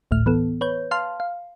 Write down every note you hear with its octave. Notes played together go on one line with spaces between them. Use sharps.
G#1 D2 A2 F6
E3 B3 A4
B4 C#5 G6
F5 A5 C6 F6
F5